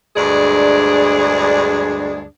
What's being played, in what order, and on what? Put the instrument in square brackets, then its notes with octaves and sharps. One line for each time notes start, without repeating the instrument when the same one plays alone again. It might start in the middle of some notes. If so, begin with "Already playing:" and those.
[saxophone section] D2 G2 G#3 D4 G#4 D5